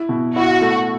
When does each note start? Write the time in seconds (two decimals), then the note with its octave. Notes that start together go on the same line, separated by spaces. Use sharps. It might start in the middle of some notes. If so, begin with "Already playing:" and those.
Already playing: E4
0.09 B2
0.36 E4 F#4
0.62 A3